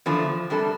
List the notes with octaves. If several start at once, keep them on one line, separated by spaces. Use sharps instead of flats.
E2 D3 F3
C3 G3 D4 A4